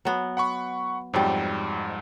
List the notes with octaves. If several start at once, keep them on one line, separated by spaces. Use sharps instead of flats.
F#3 B3
F#5 B5 C#6
F2 G#2 F#3 G3